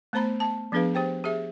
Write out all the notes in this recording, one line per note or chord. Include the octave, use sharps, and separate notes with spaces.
A3 B3 C5 A#5 B5
A5
F3 B3 D4 G#4 B4 F5
G4 C5 G5
G4 G#4 E5